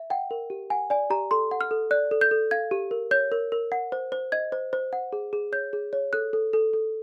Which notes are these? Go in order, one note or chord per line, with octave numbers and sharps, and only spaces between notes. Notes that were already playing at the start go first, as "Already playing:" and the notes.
Already playing: E5
F#5 G5
A#4
G4
F#5 G#5
D5 G#5
G4 A#5
A4 C6
F#5
F6
A4
D5 F#6
A4
G6
A4
F5 G#6
G4
A#4
C#5 G6
A#4
A#4
F#5
C5
C5
D#5 G#6
C5
C5
F#5
G#4
G#4
C#5 G6
G#4
C#5
A4 F#6
A4
A4
A4